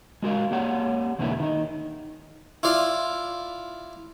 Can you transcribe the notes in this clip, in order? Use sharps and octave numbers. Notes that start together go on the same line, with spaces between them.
G#3 F#4 A#4 F5
A#3 G4 C#5 F#5
E2 B2 D3 A#3 B3 E4
D#3 D#4
E4 F4 D5 F5